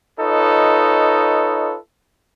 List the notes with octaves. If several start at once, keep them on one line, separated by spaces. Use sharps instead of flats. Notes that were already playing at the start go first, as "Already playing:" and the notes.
D#4 F4 A4 B4 C#5 D#5